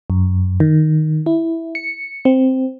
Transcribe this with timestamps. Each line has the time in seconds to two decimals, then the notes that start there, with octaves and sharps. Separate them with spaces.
0.10 F#2
0.60 D#3
1.26 E4
1.75 C#7
2.25 C4